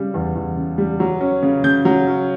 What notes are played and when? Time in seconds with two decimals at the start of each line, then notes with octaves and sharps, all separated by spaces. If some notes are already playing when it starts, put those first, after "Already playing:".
Already playing: C#3 G3
0.14 E2
0.35 E2
0.57 C#3
0.78 G3
1.00 F#3
1.21 C#4
1.43 C#3
1.64 C#3 G6
1.85 F#3
2.07 C#4